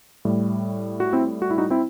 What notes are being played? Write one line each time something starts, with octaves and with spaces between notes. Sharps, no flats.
A2 G3
F#4
C4 E4
F#4
E4
D#4 F#4
C4 E4